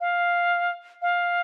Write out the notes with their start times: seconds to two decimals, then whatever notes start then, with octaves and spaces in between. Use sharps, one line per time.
0.01 F5
1.02 F5